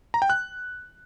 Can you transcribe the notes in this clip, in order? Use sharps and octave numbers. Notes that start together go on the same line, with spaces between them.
A#5
G5
F#6